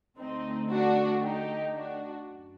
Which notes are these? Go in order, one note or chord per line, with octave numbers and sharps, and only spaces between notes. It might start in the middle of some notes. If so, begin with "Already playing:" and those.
D2 D3 A3 C4 D#4
D4 F#4
D#4 G4
D4 F#4
F#2